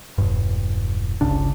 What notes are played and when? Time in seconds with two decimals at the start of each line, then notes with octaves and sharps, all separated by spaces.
0.18 E1 G2
1.21 G1 C#2 C#3 D4